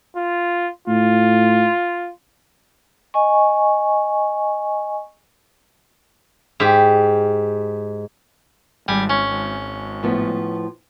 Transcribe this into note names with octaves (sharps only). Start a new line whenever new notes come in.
F4
A2 F4
D#5 G#5 C#6
G#2 G4
G#1 G3 G#5
C#4
A2 F3 B3